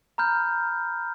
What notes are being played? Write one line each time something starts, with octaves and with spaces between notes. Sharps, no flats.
A#5 B5 F6 G6